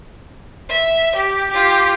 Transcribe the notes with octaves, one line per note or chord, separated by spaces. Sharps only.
E5
G4
F4 G4